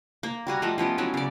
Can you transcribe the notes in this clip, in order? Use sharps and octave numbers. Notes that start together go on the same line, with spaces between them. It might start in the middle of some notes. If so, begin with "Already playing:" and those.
A#3
G3 F#4 G#5 A#5
F3 G3 A3 D#5
F3 B3 C#4 G4
F#3 A3 C#4 E4
C#3 D5